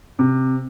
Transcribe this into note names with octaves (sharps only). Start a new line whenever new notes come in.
C3